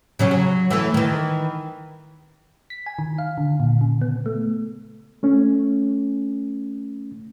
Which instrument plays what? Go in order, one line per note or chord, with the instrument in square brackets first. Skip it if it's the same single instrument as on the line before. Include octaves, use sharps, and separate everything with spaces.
[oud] C#3 F#3 C#4
F#3
E3 A3
D#3 E3
[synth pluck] B6
G#5
D#3
F5
D3
A#2
C#3
B3
A3
[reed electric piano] A3 C#4